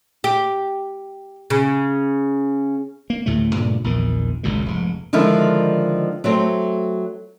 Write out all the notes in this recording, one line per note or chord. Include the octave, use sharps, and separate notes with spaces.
G4
C#3
A#3
D2 A2 C3 A3
G2 A#2 C#3 A3
A#1 E2 A#2 D#3
G#1 C#2 F#2 A#2
F1 G#2
D3 D#3 F3 G#3 E4
F#3 A3 C4